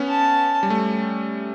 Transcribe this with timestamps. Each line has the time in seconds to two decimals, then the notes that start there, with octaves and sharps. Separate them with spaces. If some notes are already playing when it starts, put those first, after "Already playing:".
Already playing: B3 C#4
0.09 A5
0.63 G3
0.70 A3